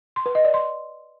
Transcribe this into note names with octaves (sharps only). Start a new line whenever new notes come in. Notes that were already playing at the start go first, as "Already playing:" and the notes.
C6
B4
D#5
D5
C6